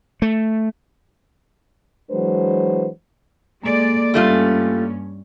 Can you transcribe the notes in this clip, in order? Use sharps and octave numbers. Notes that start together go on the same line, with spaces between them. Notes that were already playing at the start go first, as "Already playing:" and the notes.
A3
E3 F#3 G#3 D4 B4 C5
G#3 A#3 A4 D5
G2 G3 A3 C#4 F4